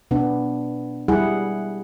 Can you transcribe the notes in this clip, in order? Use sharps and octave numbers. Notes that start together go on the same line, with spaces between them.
B2 B3 D4
G3 E4 G#4 F#5